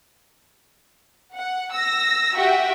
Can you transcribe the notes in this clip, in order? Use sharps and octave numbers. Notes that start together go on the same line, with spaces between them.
F#5
E6 A#6
F#4 G4 E5 G5